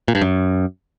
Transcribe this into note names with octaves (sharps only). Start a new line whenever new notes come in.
A#2
G2
F#2